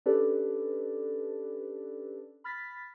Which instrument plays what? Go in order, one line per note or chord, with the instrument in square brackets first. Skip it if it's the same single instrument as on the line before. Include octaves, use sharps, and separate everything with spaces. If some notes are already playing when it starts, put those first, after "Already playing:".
[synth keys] C#4 D4 G4 A4 B4 D5
B5 F6 A6 B6